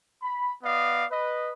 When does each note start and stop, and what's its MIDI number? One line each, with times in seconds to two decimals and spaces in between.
0.22 0.54 83
0.63 1.04 59
0.63 1.04 74
0.63 1.04 75
0.63 1.04 77
1.11 1.51 71
1.11 1.51 75